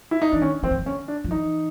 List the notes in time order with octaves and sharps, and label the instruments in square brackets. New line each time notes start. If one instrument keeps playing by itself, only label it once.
[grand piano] E4
D#4
[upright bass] E3 [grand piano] D4
[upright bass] D#3 [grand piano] C#4
[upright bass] F3 [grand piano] C4
[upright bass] E3
D#3
[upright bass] D3 [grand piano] C#4
[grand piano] D4
[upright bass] F3
[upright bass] E3 [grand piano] D#4